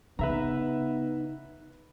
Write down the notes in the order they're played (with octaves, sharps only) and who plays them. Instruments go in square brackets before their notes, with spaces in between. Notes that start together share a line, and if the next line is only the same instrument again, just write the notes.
[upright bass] C#3 [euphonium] B3 [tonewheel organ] D#4 [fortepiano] B4 E5 A#5